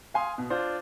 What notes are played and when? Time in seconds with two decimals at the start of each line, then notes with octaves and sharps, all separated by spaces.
0.14 F5 G#5 C6 D#6
0.38 B2
0.50 D4 F4 C5